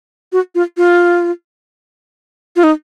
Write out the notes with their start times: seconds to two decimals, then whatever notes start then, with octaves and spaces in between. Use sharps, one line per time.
0.32 F#4
0.55 F4
0.77 F4
2.56 F4
2.63 D#4